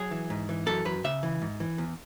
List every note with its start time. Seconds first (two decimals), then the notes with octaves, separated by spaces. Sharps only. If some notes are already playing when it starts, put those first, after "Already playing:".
Already playing: F#3 G#4
0.11 E3
0.30 G#2
0.49 E3
0.67 F#2 A4
0.85 F#2 B4
1.04 C#3 E5
1.23 E3
1.42 G#2
1.60 E3
1.78 E2